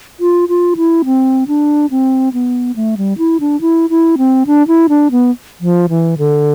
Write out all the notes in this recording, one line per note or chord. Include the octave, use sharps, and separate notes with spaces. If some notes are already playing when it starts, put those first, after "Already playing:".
F4
F4
E4
C4
D4
C4
B3
A3
G3
E4
D4
E4
E4
C4
D4
E4
D4
B3
F3
E3
D3